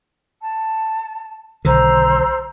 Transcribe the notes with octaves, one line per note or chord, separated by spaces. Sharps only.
A5
B1 D3 D#3 C5 A#5 E6